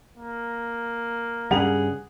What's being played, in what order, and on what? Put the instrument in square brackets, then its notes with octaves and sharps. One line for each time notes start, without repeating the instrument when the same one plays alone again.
[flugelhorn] A#3
[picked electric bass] G2 C#3 G3 [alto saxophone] G#4 [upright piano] F#5